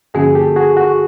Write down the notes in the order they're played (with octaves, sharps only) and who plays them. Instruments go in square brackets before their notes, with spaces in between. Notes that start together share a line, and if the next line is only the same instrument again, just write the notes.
[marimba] G2 D3 F3 A#3 C#4 [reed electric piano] F#4 G#4
[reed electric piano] G4 A4
F#4 G#4
F#4